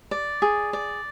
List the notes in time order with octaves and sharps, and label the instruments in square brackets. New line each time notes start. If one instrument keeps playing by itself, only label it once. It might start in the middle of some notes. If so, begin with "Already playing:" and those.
[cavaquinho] D5
G#4
D5